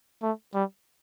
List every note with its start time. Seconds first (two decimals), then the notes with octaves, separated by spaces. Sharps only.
0.22 A3
0.54 G3